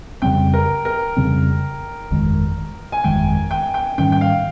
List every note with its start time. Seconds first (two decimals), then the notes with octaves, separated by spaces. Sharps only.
0.22 F2 C#3 G3 C4 G5
0.53 A#4
0.85 A#4
1.17 F2 C#3 G3 C4
2.11 G1 F2 D#3 G#3
2.92 G#5
3.04 G1 F2 D#3 G#3 G5
3.51 G5
3.74 G5
3.98 G#2 D#3 G3 C#4 G5
4.12 G5
4.21 F5